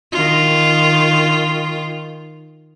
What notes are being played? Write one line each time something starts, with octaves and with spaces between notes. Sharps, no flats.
D#3 F4